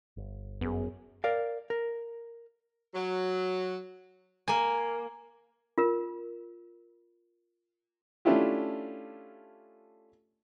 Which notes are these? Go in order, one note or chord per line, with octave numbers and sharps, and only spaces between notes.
G1
F#2 B3 G#4
A#4 D5 F5
A#4
F#3
A#3 G#5
F4 A#4
A3 C#4 D4 E4 F4 G4